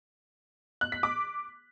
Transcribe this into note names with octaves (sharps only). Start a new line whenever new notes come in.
F#6
B6
D6